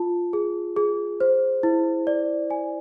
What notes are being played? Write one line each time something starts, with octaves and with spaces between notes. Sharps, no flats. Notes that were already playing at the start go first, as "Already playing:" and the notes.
Already playing: F4 A5
G#4
G#4
C5
E4
D5
G#5